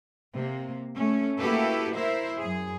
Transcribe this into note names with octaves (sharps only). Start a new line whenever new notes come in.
C3 A#3
A3 C#4
A#3 E4 F#4 G4 A4 B4
E4 A#4 C5 E5
F#2 G#4